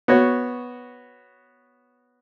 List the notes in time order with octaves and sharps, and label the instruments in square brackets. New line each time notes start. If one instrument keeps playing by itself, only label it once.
[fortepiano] B3 F#4 C#5